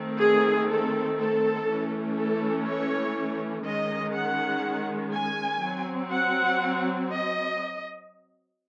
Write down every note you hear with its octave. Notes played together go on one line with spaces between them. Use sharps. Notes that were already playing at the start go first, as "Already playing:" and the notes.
Already playing: D#3 A3 C4
G#4
A4
A4
E3 A3 C#4
A4
C#5
D#3 G#3 C#4 D#5
F#5
G#5
F#3 C4
F#5
D#5